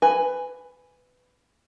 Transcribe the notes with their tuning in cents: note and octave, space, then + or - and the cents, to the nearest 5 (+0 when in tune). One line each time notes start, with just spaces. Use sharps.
B4 +15 G#5 -10